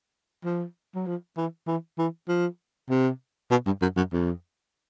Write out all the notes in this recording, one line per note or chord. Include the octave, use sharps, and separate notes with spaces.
F3
F#3
F3
E3
E3
E3
F3
C3
B2
G2
F#2
F#2
F2